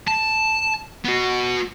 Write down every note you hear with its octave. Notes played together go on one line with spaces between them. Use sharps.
A5
B3 F#4